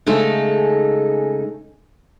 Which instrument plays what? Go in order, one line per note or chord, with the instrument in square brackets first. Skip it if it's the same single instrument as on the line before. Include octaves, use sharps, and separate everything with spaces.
[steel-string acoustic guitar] C#3 G#3 A3 D#4 A4